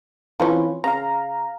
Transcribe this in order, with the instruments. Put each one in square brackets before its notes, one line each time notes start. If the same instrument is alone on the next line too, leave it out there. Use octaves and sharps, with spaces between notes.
[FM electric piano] E3 F4 B4 [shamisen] F3 C4 C#4
[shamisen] C#3 [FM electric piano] F5 A#5